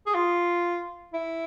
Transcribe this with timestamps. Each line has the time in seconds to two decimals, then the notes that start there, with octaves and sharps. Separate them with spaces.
0.07 G#4
0.14 F4
1.13 E4